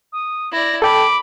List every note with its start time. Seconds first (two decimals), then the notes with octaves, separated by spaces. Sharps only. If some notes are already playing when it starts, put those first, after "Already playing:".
0.12 D#6
0.52 E4 D5 A#6
0.82 A4 G5 A5 B5 D6